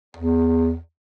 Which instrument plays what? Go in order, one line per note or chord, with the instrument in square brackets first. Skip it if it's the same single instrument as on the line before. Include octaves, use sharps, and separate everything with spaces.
[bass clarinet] E2